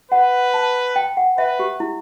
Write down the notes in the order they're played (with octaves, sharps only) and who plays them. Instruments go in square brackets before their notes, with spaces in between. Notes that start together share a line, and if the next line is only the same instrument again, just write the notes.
[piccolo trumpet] B4 [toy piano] F#5
[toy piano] A5
G5
F#5
[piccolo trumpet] B4 [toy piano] E5
[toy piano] G4
E4